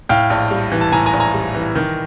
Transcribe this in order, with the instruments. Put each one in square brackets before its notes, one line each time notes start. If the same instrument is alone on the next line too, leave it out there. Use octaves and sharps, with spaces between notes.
[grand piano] A2 F5 G5
A#1
G3
E3
A5
A2 G#5 A#5
G#5 A#5
A#1
G#5 A#5
G3
E3
D#3